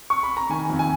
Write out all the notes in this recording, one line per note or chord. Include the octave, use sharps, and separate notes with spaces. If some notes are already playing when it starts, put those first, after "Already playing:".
C#6
B5
A#5
D#3 G#5
F2
G#5